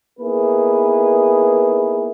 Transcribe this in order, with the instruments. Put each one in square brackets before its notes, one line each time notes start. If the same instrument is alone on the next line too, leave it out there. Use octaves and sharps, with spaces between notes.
[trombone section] A#3 B3 D#4 E4 G#4 B4